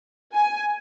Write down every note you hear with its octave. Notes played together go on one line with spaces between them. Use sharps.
G#5